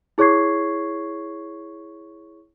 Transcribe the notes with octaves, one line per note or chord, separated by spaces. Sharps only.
E4 G#4 C#5 C#6 G#6 C7